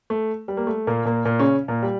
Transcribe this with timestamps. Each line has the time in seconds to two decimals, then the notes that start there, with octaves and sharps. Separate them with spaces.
0.10 A3
0.48 G3
0.57 A#3
0.67 A3
0.87 A#2 A#3
1.05 A#2 A#3
1.25 A#2 A#3
1.39 C#3 C#4
1.68 A#2 A#3
1.83 G3